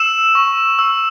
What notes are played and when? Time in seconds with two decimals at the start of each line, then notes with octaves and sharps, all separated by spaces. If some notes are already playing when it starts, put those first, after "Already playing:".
Already playing: E6 E7
0.35 C#6
0.79 E6